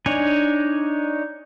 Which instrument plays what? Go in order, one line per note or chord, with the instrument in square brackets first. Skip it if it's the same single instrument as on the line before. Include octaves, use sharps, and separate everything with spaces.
[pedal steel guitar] D4 D#4 C#5 G#5